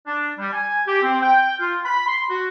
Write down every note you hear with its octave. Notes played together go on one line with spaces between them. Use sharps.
D4
G3
G#5
G4
C4
G5
F4
B5
C6
F#4